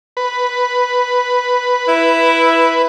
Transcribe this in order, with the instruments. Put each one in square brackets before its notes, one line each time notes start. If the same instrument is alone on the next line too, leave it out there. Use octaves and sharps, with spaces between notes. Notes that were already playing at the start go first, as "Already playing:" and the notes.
[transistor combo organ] B4
[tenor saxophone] E4